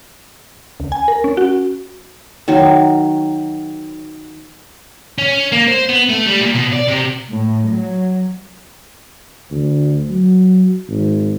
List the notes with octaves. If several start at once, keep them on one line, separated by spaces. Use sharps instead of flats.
C#2
G#5
A#4
C#4
F#4
D#3 F#3 D#4
C#4
A#3
C5
B3
A3
G3
A#2
B2
D5
C3
A2
F#3
D2
F#3
G#1